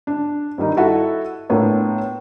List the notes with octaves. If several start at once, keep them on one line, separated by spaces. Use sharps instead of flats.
D4
G2 D#3 G3 D#4
E4 F#4 A4 E5 F#5
A2 A#3 B3 D4 F4 C#5